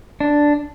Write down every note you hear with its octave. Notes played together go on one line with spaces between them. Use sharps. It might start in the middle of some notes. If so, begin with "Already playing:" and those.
D4